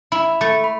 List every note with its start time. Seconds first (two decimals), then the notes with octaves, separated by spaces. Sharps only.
0.12 E4 B5
0.41 A3
0.64 B5